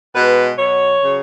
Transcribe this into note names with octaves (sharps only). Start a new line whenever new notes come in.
B2 G#3 B4
B2 F#3 C#5
C#3 F#3